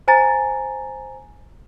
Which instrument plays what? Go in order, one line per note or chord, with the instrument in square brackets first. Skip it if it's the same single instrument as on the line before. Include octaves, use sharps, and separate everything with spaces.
[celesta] C5 G#5 A#5 A6